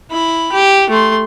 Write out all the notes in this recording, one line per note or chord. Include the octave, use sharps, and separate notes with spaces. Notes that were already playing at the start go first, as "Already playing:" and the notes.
E4 B5
G4
A3 C6